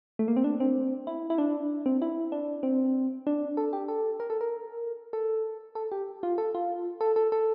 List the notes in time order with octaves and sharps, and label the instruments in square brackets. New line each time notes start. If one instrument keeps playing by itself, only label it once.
[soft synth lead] A3
A#3
C4
D4
C4
E4
E4
D4
C4
E4
D4
C4
D4
A4
G4
A4
A#4
A4
A#4
A4
A4
G4
F4
A4
F4
A4
A4
A4